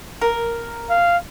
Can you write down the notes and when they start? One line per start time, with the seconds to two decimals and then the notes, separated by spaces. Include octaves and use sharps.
0.21 A#4
0.90 F5